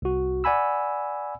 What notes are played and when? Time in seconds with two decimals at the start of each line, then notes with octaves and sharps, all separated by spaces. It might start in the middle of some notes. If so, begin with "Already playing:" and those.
0.02 C2 F#4
0.44 D5 F#5 G#5 B5 E6